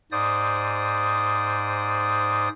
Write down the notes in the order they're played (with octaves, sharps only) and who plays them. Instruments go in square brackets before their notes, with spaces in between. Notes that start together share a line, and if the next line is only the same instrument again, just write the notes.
[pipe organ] G#2 C5 D5 D#6